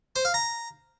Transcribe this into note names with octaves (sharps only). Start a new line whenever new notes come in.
C5
F5
A#5